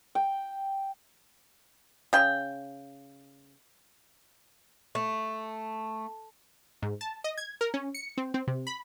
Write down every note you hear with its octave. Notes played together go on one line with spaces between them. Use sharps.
G5
C#3 G5
A3
G#2
A5
D#5
G#6
A#4
C#4
C#7
C4
C4
C3
B5